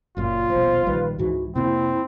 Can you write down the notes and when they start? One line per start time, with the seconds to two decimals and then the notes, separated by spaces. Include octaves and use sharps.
0.17 F#1 F#2 A#2 F4
0.50 D#1 A#1 B2 C5
0.87 A#1 D#3 G3 B4
1.18 C#2 G#2 E3 F#4
1.55 F2 C3 A#3 C4 E4